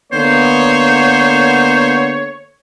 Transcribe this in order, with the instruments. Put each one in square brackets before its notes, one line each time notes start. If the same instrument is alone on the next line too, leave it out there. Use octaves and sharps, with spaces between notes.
[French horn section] D3 A#3 B3 [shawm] C5 [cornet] C#5